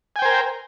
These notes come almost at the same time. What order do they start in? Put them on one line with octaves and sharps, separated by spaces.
G#5 G5 C5 A#4